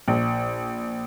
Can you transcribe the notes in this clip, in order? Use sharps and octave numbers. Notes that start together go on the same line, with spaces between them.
A#1